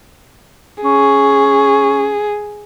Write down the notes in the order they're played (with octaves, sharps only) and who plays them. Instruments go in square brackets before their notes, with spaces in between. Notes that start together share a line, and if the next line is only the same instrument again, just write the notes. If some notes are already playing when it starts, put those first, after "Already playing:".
[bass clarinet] C#4 [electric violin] G#4